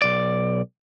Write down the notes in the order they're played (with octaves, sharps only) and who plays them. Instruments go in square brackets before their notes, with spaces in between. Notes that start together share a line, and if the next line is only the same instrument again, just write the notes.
[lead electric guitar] B1 D5